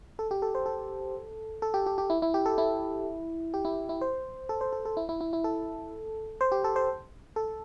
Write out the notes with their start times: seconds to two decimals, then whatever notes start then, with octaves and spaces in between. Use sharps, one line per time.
0.19 A4
0.31 G4
0.42 A4
0.55 C5
0.66 A4
1.62 A4
1.74 G4
1.86 G4
1.98 G4
2.10 E4
2.22 E4
2.34 G4
2.46 A4
2.58 E4
3.54 G4
3.65 E4
3.89 E4
4.01 C5
4.49 A4
4.61 C5
4.73 A4
4.85 A4
4.97 E4
5.09 E4
5.21 E4
5.33 E4
5.44 A4
6.41 C5
6.52 G4
6.64 A4
6.76 C5
7.36 A4